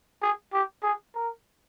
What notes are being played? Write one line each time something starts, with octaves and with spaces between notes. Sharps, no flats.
G#4
G4
G#4
A#4